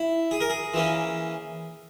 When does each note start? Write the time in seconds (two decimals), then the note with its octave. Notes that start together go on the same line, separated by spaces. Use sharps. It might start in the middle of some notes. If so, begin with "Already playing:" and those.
Already playing: E4
0.31 G#4
0.41 A#4
0.50 G#4
0.74 E3 A#3 C#4